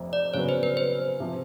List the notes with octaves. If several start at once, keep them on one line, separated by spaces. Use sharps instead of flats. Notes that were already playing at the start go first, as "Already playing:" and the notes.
Already playing: F1 F2 C3
D5
C#3 F#3 B3 C#5
C5
B4
C5
C3 F3